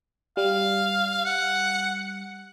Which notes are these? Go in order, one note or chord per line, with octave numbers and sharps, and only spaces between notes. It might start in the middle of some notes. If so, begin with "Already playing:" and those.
G3 F5
F#5